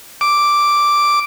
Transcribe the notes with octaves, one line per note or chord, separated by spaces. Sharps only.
D6